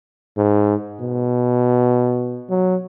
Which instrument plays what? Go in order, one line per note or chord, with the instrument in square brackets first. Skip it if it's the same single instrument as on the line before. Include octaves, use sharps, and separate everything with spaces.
[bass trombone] G#2
B2
F#3